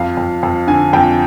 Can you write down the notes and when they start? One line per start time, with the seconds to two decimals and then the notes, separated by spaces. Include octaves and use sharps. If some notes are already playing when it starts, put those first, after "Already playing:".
Already playing: F2 F5
0.17 F2
0.43 F2
0.68 D3 G#5
0.93 F2 G5